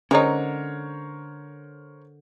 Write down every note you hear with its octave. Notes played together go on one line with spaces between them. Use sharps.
D3 G#3 C#4 D#4 A#4 C5 C#5 C#6